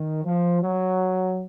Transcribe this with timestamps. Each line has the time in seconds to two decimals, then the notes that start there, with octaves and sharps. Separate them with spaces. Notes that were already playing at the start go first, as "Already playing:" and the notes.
Already playing: D#3
0.24 F3
0.62 F#3